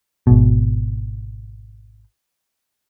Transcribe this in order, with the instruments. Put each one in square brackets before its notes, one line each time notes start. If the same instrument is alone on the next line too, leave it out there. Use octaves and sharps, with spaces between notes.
[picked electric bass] G#1 B2